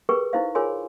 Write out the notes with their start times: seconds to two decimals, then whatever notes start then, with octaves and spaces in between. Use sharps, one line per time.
0.09 G4 G#4 A#4 B4 G5 C#6
0.33 D#4 E4 C5 F5
0.55 F4 G#4 A#4 C#5 G#5 C6